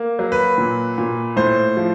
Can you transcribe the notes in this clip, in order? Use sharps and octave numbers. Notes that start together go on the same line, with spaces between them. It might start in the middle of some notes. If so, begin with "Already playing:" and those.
Already playing: A#3
F#3
B4
A#2
A#2
A2 C5
F3